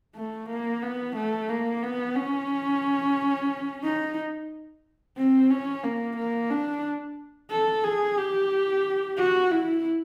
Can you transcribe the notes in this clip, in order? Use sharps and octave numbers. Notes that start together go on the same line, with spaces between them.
A3
A#3
B3
A3
A#3
B3
C#4
D#4
C4
C#4
A#3
A#3
D4
A4
G#4
G4
F#4
E4